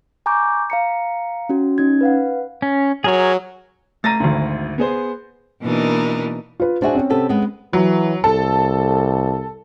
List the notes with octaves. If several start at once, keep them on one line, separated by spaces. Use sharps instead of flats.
G#5 A#5 C#6 D6 G6
F5 A#5 C#7
C#4 F#4
C#4 D#4 G#6
B4 F5 F#5
C#4
F#3 G#4 A#4 C#5
A3 A#5 A6 A#6 D#7
G#1 D2
B3 G#4 C5
B2 E3 A#3 D4 D#4 A#4
F4 B4
D4 F#4 G#4 C5 E5 G#5
C4 C#4
C3 B3 A4
G#3 B3
E3 F#3
C2 A4